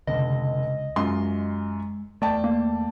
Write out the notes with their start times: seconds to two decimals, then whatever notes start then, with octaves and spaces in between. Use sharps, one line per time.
0.07 F1 C#2 D3 D#5
0.96 F#2 G#3 F4 C6
2.22 E2 A3 D5 G5 A5
2.44 A#3